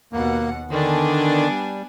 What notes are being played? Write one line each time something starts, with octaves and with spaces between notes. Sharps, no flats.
D#2 B2 A#3 F#5
D3 D#3 B3 D4 G#5
G3